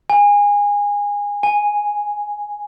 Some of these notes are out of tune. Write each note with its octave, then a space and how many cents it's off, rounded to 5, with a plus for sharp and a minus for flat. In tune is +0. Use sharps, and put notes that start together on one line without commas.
G#5 -25
G#5 -5